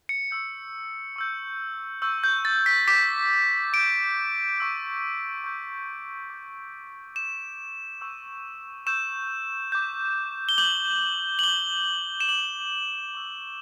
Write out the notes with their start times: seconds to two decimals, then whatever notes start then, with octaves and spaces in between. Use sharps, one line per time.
0.09 C#7
0.31 C#6 E6 G6
1.16 C#6 E6 G6
2.02 C#6 E6 G6
2.24 G6
2.45 A6
2.66 B6
2.88 D6 G6 B6
3.73 D6 G6 D7
4.58 C#6 E6 G6
5.44 C#6 E6 G6
6.30 D6 G6
7.15 D6 G6 E7
8.01 C#6 E6 G6
8.86 C#6 E6 G6 E7
9.72 D6 G6
10.49 G7
10.58 D6 G6 F#7
11.39 F#7
11.43 D6 G6 G7
12.20 E7
12.29 D6 G6 F#7
13.15 C#6 E6 G6